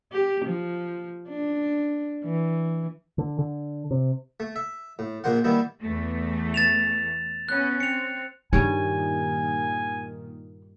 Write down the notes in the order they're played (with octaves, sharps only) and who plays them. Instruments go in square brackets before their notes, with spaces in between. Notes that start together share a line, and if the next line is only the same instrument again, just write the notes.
[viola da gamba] G4
F3
D4
E3
[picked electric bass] D3
D3
C3
[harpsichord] A3
E5
A2
A#1 A#2 A#3 C5 F#5
D#3 G3 A#3 B3 E4
[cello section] E2 A3
[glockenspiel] A6 E7 F7
[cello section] B3 C#4 [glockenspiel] F#6
[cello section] C4 [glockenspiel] C#7 F7
[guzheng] G2 G3 C#5 [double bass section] A#2 D#3 [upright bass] D#4 [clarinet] G#5